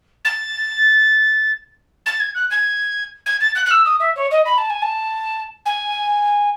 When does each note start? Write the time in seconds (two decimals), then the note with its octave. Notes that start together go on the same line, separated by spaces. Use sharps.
0.24 A6
2.06 A6
2.20 G#6
2.34 F#6
2.50 G#6
3.26 G#6
3.40 A6
3.55 F#6
3.65 F#6
3.70 E6
3.85 D#6
4.00 E5
4.16 C#5
4.31 D#5
4.45 B5
4.57 A5
4.69 G#5
4.82 A5
5.65 G#5